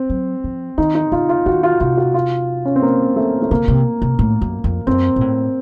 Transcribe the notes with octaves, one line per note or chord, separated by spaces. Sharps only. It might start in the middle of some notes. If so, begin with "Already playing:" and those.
Already playing: C4
F#3
F3
D#3 D#4
D#4
C#3 F4
F4
D#3 F#4
F4
C3 F4
F#4
F4
C#4
C4
A#3
A3
A3
C#3 A#3
C3
C3
A2
F#2
F2
F#2 C4
A#2
A2